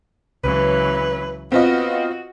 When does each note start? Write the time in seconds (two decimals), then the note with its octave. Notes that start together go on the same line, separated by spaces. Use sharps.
0.44 C#2 C#3 E3 F#3 B4
1.52 B3 C4 F4 F#4 D#5